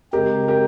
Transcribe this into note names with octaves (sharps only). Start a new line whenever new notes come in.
C#3 G#3 C4 G4 A#4
G4 A#4